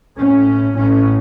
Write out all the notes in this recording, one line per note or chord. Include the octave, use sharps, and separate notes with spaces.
A2 C#4
A2 C#4